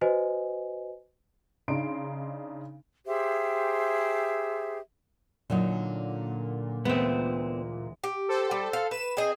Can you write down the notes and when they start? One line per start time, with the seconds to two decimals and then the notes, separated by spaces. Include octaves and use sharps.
0.01 F#4 B4 C5 D#5 G#5
1.68 C#3 D4 D#4 C6 D7
3.06 G4 G#4 C5 E5
5.50 A#2 D3 F#3 D#4
6.85 D2 E3 G#3 B3 C4
8.04 G4
8.28 A4 C5
8.51 G3
8.73 F5
8.91 B4 E7
9.17 C4 G#4 D#5